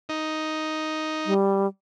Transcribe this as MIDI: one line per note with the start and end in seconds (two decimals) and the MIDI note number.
0.09 1.34 63
1.26 1.67 55